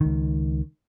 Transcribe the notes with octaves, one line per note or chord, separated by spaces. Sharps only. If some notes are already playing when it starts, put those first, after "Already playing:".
C#2 D#3